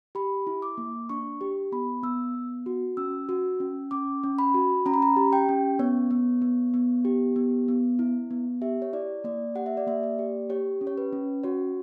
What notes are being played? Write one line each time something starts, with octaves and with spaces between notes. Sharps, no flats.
G4 B5
E4
D6
A#3
D4 C#6
G4
B3 B5
B3 E6
B3
F#4
C#4 E6
F#4
C#4
C#4 D6
C#4
B5
F#4
C#4 A#5
B5
A#5
G4
G5
C#4
B3 C#5
B3
B3
B3
G4
B3
B3
E4
B3
G4 E5
C#5
E4 D5
A#3 D5
G4 F#5
E5
D5
A#3 E5
D5
G4
G4 C#5
C#4
C#5
B4
C#4
F#4 C#5